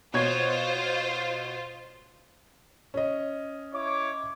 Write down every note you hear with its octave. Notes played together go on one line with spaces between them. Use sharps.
B2 F4 C5 C#5 G#6
C#4 D#5
E4 C#5 D6